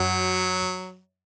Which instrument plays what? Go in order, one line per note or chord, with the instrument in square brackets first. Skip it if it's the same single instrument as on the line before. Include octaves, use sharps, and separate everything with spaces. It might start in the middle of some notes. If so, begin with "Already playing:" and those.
Already playing: [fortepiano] F#2 [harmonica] F#3